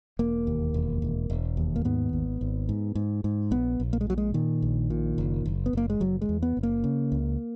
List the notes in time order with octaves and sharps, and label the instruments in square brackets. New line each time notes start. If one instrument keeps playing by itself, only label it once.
[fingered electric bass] E1 A#3
D#2
E1
E1
E1
D#2
A#3
G#2 B3
G#1
G#1
G#2
G#2
G#2
A#1 B3
A#1
A#3
G#3
A#2 F#3
G#3
A#2 D#3
A#1
A#2
F#1
F#1
B3
F#1 A#3
G#3
F#1 F#3
G#3
E2
B3
F#1
A#3
C#3
C#2